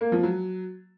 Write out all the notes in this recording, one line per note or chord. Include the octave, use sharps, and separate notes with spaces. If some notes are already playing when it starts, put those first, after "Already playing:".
A#3
F3
F#3